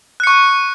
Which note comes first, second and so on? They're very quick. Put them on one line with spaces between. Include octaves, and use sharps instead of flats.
F#6 C#7 C#6